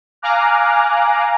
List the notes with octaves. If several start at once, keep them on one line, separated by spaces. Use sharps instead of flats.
F5 G#5 A#5 D6 F6 F#6